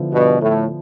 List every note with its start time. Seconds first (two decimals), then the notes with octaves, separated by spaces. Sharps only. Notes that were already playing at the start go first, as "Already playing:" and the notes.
Already playing: D3 F3 B3 E4
0.12 G2 B2
0.41 A2